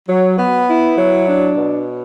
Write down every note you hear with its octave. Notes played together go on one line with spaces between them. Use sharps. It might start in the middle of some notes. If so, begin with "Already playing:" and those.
F#3
B3
E4
F#3
D4
B2